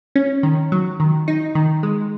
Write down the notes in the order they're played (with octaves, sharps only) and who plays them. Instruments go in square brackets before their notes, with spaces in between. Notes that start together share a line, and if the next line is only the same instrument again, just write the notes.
[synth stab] C#4
D#3
F#3
D#3
D#4
D#3
G#3